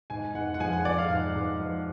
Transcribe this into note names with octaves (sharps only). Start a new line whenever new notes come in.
G#2 G#5
G#2 F#5
F#5
F3 G#5
F#5
F3 D5
F5
G#2
G#2
F3